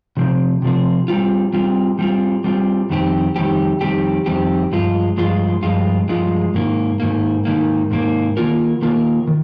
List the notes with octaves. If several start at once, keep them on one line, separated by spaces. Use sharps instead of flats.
C3 F3 C4
C3 F3 C4
G3 C4 F4
G3 C4 F4
G3 C4 F4
G3 C4 F4
F2 D#3 G3 C4 G4
F2 D#3 G3 C4 G4
F2 D#3 G3 C4 G4
F2 D#3 G3 C4 G4
G2 F3 G#3 F4
G2 F3 G#3 F4
G2 F3 G#3 F4
G2 F3 G#3 F4
G#2 D#3 A#3
G#2 D#3 A#3
G#2 D#3 A#3
G#2 D#3 A#3
D#3 A#3 F4 A#4
D#3 A#3 F4 A#4
D#3